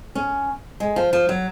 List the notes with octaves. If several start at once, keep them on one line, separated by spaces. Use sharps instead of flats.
C#4
G#3
F3
F3
F#3